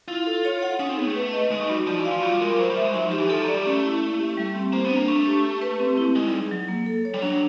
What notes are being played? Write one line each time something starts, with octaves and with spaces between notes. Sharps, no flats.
E4 F4
A4
C#5
F#5
C#4 D#4
C4
B3 G#4
A3
B4
D#5
G#3 D#4
A3
G3 F#4
F3 D5
E3
F5
F3
F#3 F4
G3
G#3 A#4
G3
F#3 C5
G3
E5
G#3
F#3 D#4
F3
G4
E3
F3 A4
F#3
D5
G3
A3 C#4
E4
E4
G4
G3
C4
A#3 C5
B3
D4
A#3
A3 D4
G4
G4
B4
C4
E4
G#3 D#4
G3
G#4
F#3
A#3
A4
C#5
G3
F#3 D4